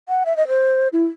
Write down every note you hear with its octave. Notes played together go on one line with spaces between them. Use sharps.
F#5
E5
D#5
C5
E4